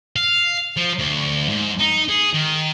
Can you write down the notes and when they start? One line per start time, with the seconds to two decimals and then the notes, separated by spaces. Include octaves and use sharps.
0.16 F5
0.77 F3
0.99 D2
1.49 G#2
1.79 D#4
2.09 G#4
2.34 D#3